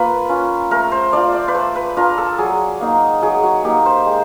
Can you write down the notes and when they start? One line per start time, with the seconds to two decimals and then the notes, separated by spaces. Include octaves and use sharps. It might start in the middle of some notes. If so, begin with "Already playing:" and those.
Already playing: A#3 F4 B4
0.29 C#4 F4
0.71 A3 A#4
0.92 C5
1.13 D4 F4 D5
1.34 D5
1.48 B4
1.55 A3 C5
1.76 B4
1.97 D4 F4 A#4
2.18 A4
2.38 F#3 G#4
2.81 A#3 D#4
3.22 F#3 G#4
3.43 F#4
3.64 A#3 D#4 G4
3.86 C5
4.06 G#3